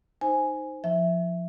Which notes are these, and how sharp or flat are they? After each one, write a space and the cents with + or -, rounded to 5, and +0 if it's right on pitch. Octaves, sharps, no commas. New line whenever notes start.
D#4 +0 C5 +0 G#5 +0
F3 +5 E5 +0